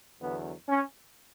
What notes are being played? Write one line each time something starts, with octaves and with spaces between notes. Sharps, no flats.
E2 D3 F#3 B3
C#4